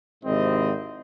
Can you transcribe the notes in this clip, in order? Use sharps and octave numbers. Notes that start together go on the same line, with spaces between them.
G#1 G#2 C3 C4 E4 D#5